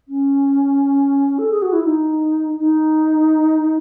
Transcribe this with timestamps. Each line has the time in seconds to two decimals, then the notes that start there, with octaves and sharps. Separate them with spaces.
0.08 C#4
1.38 A4
1.51 G#4
1.62 F#4
1.73 E4
1.84 D#4
2.59 D#4